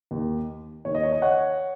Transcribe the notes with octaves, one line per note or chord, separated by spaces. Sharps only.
D#2 D#3
D#2 D#3 C#5
D#5
C#5
D#5
C#5 F#5